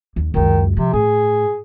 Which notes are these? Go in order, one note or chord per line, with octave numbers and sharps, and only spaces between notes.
D#2
C#2 F#2 D#3
C3 F3
A2 G#4